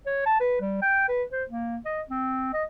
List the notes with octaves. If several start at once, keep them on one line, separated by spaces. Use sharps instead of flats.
C#5
A5
B4
G3
G5
B4
C5
A#3
D#5
C4
D#5